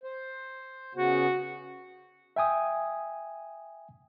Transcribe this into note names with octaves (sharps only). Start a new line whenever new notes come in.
C5
C#3 B3 F#4
E5 G5 G#5 D#6